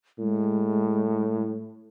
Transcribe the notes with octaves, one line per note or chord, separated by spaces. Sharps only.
A2 G#3